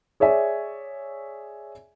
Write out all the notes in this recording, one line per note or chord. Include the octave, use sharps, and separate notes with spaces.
G#4 C#5 D5 E5 G#5